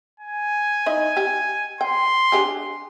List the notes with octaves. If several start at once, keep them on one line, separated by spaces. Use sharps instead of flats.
G#5
D#4 E4 D#5
G4
G5 C6
D4 G4 G#4